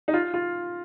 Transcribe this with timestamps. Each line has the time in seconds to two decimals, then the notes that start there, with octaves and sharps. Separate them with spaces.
0.08 D#4
0.14 F4
0.34 F4